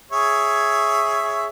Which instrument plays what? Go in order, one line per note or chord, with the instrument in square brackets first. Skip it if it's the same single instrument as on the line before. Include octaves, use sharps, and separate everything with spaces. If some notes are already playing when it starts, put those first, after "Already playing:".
[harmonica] G#4 C#5 E5